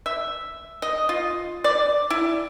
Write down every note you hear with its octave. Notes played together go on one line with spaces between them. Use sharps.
E5
D#5
F4
D5
E4